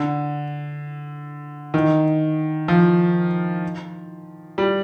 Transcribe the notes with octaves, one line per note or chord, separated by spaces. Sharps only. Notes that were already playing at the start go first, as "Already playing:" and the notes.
Already playing: D3
D#3
F3
G3